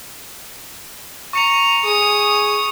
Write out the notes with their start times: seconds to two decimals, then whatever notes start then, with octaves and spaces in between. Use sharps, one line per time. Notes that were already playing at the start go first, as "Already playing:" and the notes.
1.33 A#5 C#6 C#7 F7
1.84 G#4 D#6